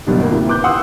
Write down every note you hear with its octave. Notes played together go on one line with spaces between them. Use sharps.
F#1 B2 G3 D4
D2 A#3
A2 C3 D#3
E2 B4 D6 F#6 G6
F#5 C6 D#6 E6